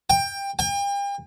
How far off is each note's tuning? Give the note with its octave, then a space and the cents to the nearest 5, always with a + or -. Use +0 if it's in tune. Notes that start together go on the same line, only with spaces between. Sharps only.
G5 +20
G5 +40